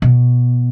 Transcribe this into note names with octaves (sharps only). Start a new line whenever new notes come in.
B2